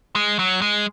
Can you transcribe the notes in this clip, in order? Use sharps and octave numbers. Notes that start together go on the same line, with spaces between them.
G#3
F#3
G#3